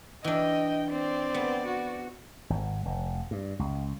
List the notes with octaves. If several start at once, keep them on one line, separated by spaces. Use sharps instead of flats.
E3 D4 D#5 G5
C4 D5
B3
F#4
G#1
F1
G2
C#2